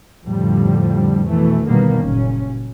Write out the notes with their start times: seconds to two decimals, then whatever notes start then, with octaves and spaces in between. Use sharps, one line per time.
0.25 F2 A2 D3 G3
1.28 B2 E3 A3
1.67 B2 D3 D#3 G3 A#3 B3
2.02 F#1 A#2 C#4